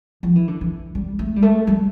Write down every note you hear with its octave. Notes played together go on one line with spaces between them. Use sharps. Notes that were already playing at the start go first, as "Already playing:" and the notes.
F3
E3
D3
E3
G3
A3
G3
A3
G3